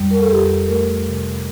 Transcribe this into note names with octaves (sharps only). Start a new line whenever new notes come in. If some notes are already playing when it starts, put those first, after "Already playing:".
Already playing: F2 G3
A#4
A4
F2 G4
A3 A#4
C3